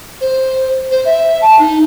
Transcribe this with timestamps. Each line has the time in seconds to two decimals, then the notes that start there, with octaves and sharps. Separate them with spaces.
0.21 C5
0.91 C5
1.05 E5
1.42 A5
1.59 D#4